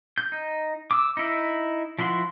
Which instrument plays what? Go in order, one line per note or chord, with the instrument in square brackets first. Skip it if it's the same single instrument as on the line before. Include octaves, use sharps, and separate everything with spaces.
[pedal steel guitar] G6
D#4
D6 E6
D#4 E4
F3 E4 F#4 C6